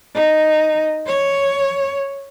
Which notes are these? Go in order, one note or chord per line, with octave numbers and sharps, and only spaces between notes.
D#4
C#5